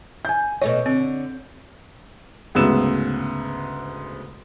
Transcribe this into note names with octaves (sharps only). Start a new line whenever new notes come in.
G#5 G6
B2 A3 D#4 C#5
D3 C4
D2 G#2 C#3 B3 E6 E7